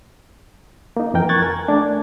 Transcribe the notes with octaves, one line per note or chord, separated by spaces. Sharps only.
A#3 D#4
F2 E3 A#4 G5
C#6 F#6 G#6 A6
A#4 G#5
A3 D4